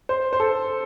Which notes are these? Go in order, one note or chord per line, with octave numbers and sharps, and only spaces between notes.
C5
C5
A4